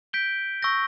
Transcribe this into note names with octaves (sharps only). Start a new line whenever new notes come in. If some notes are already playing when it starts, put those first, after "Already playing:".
G6 B6 D7 G7
C#6 E6 G6 A#6